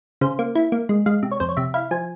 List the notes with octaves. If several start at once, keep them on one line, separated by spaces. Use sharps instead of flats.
C#3 C5
A#3
E4
A#3
G#3
G#3 F5
C3
C#5
F2 C5
C#5
C3 E5
E4 F5
F3 G#5